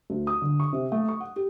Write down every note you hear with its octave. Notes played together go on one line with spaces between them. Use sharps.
D2
D#6
D3
C#6
C3
A3
C#6
F#5
G4